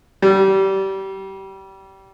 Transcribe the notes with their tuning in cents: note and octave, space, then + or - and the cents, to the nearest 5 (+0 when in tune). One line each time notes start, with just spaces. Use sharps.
G3 -25